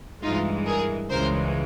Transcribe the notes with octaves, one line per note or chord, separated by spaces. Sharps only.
G2 E3 G#3 D#4 F4
G#4 A#4
C#2 C#3 E3 G#3 A#4 C5